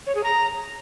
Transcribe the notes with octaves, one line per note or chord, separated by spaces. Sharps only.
C#5
G#4
A#5